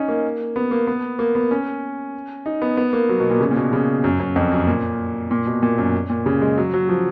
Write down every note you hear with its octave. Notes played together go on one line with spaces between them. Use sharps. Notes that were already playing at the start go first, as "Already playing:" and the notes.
Already playing: C#4 D#4
A#3
B3
A#3
B3
A#3
B3
C#4
D#4
B3
B3
A#3
F#3
B2
A#2
C#3
A#2
B2
C#3
F#2
F#2
F2
F#2
A#2
A#2
B2
A#2
F#2
A#2
C#3
G#3
F#3
F#3
F3